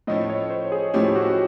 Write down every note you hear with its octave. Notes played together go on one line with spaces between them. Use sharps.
A2 F3 A3 C#4 E4 D#5
C#5
C5
G#4
A2 F3 A3 C#4 E4 G4
F#4